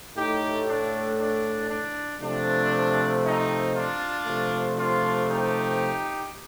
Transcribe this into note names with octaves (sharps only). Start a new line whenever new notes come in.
A2 A3 D#4 G4
D4
D4
D4
C3 F3 A3 D4
C4 D#4
D4 F4
C3 F3 A3
D4 F4
D#4 G4